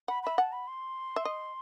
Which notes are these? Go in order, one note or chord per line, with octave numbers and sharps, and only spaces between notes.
F#5 B5
E5 B5
F#5 A5
B5
C6
E5
D#5